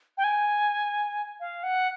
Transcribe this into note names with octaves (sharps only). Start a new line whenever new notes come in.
G5
G#5
F5
F#5